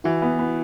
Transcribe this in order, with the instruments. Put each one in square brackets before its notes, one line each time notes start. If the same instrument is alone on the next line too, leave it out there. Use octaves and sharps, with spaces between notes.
[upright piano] E3 [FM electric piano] E4 F#4
[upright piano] B3
B3